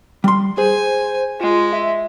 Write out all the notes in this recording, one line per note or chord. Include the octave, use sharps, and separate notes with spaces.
G3 C6
G#4 C5 G#5
G#3 F4
E5